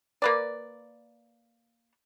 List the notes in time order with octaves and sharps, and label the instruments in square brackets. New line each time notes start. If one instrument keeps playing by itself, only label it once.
[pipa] A#3 B4 D5